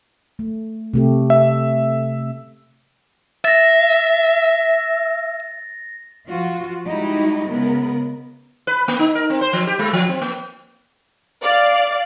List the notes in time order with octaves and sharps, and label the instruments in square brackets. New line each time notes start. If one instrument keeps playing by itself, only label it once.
[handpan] A3
C3 A3 G4
[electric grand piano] E5
[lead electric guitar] E5 [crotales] A6 A#6
[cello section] F3 F4 F#4
G3 G#3 D#4 E4 F#4 G4
C#3 G#3 B3 A#4
[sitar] B4
A#3
D#4
A#4
C4
C5
F3
G4
G#3
F3
C4
A#3
[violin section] D5 F5